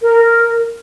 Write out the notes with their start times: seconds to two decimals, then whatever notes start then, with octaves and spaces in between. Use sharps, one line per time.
0.01 A#4